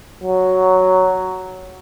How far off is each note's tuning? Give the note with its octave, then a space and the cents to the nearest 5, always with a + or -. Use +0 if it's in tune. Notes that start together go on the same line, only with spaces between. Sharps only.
F#3 +5